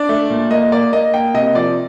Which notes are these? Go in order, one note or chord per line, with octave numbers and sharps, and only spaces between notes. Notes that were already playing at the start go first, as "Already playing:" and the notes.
Already playing: D4 D5
A3
A#2
A#3 D#5
A#3 D5
A#3 D#5
A#3 G5
C3 D#5
F3 D5